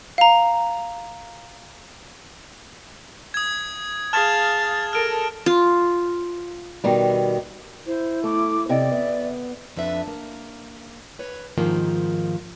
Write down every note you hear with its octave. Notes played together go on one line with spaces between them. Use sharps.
F5 A#5
D#6 G#6
G#4 F5 A5 F6 G#6 A6 E7
A4 A#4 F6 D7
F4
B2 D#3 G3
E4 C5
A3 D6
C3 D5 D#5 G5
B3 E5
F2 D4 B4 E5
A#3
B4 C#5
G#2 D#3 F3 A#3